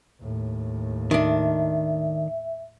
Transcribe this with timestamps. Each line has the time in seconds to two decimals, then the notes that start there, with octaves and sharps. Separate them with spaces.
0.21 D#2 A2
1.11 D#3 D4 E5